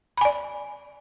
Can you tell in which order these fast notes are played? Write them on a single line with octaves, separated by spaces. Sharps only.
B5 G#5 D5